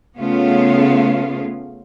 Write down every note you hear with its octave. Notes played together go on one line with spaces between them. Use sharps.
C#3 A3 B3 C#4 F4